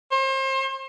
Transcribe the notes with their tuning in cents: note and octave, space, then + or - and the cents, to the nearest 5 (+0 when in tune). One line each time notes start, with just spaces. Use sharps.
C5 +35